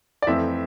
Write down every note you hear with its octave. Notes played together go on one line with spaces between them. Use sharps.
D5
F2 E3 A3 C4 E5